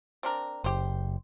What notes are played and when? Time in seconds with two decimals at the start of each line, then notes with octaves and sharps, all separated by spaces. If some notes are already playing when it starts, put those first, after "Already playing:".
0.23 C4 D4 A#4
0.64 F#1 G4 C5